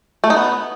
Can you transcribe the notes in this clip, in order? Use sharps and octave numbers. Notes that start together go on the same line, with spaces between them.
A3
D#4
B3